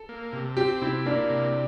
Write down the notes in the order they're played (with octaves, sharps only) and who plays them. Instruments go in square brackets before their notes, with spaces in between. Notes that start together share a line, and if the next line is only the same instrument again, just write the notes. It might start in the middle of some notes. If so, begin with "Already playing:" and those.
Already playing: [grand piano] A4
[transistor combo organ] A#3
C3
[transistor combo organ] C4 [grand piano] G4
[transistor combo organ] C3 [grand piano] E4
[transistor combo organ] A#3 [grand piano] D4
[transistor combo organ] C3